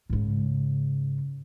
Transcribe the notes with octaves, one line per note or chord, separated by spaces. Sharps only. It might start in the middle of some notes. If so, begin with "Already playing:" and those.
G#2 C#3